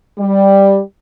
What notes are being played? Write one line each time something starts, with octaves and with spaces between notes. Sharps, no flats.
G3